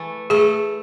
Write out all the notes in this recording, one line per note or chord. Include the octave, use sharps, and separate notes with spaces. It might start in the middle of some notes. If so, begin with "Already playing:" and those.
Already playing: E3 A3
A3 G#4